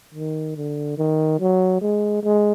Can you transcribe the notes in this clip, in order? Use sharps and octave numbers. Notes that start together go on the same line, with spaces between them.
D#3
D3
D#3
F#3
G#3
G#3